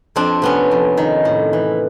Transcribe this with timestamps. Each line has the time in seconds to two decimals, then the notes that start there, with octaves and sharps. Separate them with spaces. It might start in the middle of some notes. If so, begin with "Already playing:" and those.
0.16 F2 C4 D4
0.42 C3 B3 C#4
0.71 F2
0.97 D#3
1.25 A2
1.53 E3